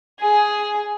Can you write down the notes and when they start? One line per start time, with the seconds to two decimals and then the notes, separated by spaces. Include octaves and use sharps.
0.20 G#4